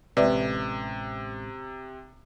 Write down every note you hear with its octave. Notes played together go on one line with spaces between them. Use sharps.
A1 C3 G#3 B4 D5 E5